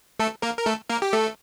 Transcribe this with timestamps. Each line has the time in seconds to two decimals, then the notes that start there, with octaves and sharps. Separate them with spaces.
0.20 A3 A4
0.42 A#3 A#4
0.58 A#4
0.66 A3 A4
0.90 A#3 A#4
1.02 G4
1.13 A3 A4